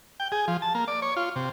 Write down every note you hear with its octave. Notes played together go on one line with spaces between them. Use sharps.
G5
G#4
F3
A5
A#3
D5
C#5
F4
C3